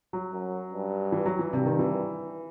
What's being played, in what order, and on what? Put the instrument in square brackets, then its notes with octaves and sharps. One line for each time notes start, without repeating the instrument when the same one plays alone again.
[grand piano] F#3
[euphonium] F#2
G2
[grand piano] E3
F#3
E3
[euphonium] G2 [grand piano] C3
[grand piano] D#3
E3